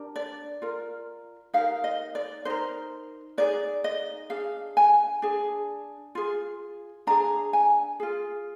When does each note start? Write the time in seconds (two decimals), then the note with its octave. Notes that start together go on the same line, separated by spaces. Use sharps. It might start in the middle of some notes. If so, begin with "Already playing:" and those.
Already playing: D4 G4 A#4
0.16 D5
0.62 F4 A#4
1.54 D#4 G4 A#4 F5
1.84 D#5
2.15 D5
2.45 D#4 A#4 C5
3.38 D#4 G#4 D5
3.84 D#5
4.30 D4 G#4 F5
4.77 G#5
5.22 D4 G#4
6.15 F4 G#4
7.07 D4 G#4 A#5
7.53 G#5
8.00 F4 G#4